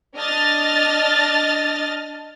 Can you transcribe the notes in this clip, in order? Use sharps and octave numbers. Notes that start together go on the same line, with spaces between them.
D4 D#5 F6 A6